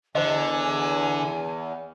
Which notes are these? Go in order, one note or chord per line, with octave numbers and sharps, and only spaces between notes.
E2 D3 C5 D#5 G#5